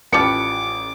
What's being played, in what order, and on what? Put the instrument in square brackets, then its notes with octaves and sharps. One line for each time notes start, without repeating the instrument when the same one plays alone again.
[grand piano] A1 C#7 [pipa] F3 G3 B4 [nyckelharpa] D6